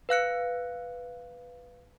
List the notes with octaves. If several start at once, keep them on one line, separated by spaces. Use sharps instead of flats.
B4 F5 F#6 C#7